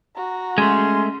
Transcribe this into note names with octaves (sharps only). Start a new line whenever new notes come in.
F#4 A#5
G#3 A3 C#4 C6